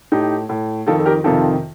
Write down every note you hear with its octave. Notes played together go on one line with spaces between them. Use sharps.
A2 D#4 G4
A2
F2 D#3 F4 A4
A4
G4 A#4
F2 C3 D#3 F4 A4